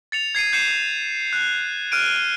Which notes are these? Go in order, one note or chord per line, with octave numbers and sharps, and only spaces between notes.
A6 C#7 F7
G#6 C7 C#7 D#7
G6 C7 C#7 E7
F#6
F6 F#6 D7 D#7